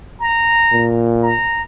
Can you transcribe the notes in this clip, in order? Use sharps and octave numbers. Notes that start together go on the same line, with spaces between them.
A#5
A#2
A#5